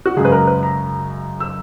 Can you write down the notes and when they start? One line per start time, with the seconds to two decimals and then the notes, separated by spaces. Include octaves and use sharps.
0.06 F#4
0.17 F#2 C#3 G#3 G#4
0.25 B4
0.32 A#4
0.47 B4
0.63 A#5
1.40 E6